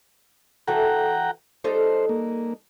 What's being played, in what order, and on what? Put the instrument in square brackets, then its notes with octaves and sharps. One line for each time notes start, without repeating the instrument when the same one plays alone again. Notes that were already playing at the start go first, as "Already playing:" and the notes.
[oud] E3 F#4 A4 [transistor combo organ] F#5 G5 A#5
[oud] G3 D#4 A4 [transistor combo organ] C5
[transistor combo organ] A#3